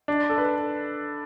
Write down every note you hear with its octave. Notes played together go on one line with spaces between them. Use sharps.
D4
A4
B4